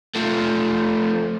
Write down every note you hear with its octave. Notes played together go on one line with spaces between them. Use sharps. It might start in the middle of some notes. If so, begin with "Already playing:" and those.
F3 A3